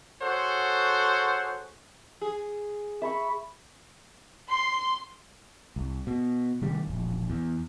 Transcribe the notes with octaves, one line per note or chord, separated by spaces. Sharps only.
F#4 G#4 A4 C5 C#5 F#5
G#4
E5 B5 C#6
C6
C2
B2
C3 D#3 G3
E1 A#1
E2